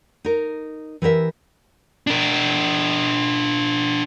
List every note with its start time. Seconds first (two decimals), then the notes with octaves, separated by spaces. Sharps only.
0.25 D#4 A#4
1.02 E3 G4 A#4 E5
2.07 D4 A#4